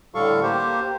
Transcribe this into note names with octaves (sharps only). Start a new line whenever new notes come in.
A2 D3 G3 A4 F5 C#6
A#3 G4 C5